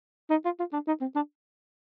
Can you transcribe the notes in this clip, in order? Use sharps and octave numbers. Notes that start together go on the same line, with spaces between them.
D#4
F4
F4
D4
D#4
C4
D4